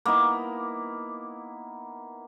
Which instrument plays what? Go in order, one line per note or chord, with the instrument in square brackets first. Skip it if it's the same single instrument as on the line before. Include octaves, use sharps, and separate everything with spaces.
[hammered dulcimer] A#3 B3 D#4 E4